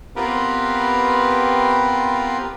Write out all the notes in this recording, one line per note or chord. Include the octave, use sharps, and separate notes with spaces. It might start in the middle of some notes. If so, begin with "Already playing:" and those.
B3 C4 F4 G4 A#4 B4